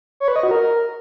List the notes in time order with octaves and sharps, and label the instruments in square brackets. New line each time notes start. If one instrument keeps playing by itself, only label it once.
[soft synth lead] C#5
B4
D#5
F#4
A#4